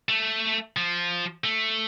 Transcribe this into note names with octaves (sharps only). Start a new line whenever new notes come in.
A3
F3
A3